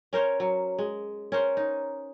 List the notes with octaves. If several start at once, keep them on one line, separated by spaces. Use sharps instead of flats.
C#4 A#4 C5 C#5
F#3
G#3
C#4 A#4 C5
D#4